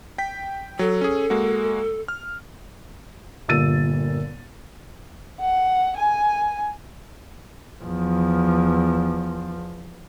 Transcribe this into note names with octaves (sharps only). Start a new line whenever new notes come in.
G5 B6
F#3 A4
C#4 G#4
G#3 A#3 F#4
F6
G1 A#2 E6 A6 D#7
F#5
G#5
E2 F3